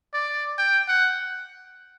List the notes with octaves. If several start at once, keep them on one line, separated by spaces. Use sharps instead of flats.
D5
G5
F#5